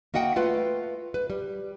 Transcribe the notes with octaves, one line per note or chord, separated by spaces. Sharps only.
A#3 F#4 D#5 F#5 G5
A3 F4 B4
B4
G3